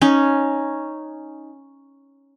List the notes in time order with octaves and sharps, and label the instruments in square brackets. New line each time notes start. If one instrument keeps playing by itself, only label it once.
[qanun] C#4 D#4